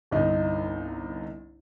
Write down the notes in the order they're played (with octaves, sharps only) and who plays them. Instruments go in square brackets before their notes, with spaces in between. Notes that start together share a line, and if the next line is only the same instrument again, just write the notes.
[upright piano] G1 C2 D#4